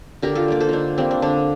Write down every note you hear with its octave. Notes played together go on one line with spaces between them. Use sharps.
D3 G4 A#4
F4 A4
G3 A#3 D5
A4 C5
D3 D4 D#4
G3 A#3 C4
D4
D3 D4